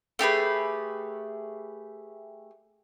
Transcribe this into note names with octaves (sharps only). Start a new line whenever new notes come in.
A3 G4 G#4 B4